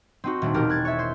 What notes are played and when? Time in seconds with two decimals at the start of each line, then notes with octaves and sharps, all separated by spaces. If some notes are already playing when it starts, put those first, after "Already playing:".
0.24 C4 D#4 F#4
0.42 D#1 A3 D4
0.54 E1 G4 A#4
0.70 F#6 G#6 A6
0.85 C#5 E5
0.99 C5